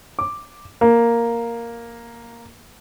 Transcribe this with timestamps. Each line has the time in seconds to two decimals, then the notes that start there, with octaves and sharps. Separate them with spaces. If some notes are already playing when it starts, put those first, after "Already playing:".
0.19 D6
0.81 A#3